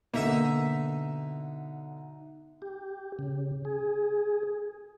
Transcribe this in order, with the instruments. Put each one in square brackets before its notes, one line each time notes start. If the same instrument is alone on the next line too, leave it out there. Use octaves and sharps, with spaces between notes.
[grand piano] B2 D3 [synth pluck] A#3 [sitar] D#4 E5
[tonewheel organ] G4
C#3
G#4